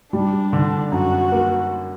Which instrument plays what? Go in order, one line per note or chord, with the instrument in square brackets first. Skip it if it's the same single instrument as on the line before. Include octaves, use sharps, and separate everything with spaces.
[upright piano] G3 [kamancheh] D4
[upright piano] D3
[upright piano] F#2 [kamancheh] F#4
[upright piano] A#3